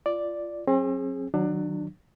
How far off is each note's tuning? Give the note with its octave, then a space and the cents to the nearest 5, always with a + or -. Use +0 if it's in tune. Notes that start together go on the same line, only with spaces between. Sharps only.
F4 -20 D5 +0
F#3 -25 C4 +40 G#4 +0
D#3 +0 F#3 +0 D4 +25